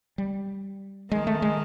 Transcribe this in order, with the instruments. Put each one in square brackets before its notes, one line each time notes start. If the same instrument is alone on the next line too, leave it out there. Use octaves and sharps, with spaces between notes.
[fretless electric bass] G3
[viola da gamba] D#3 [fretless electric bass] G#3
[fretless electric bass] A3
G#3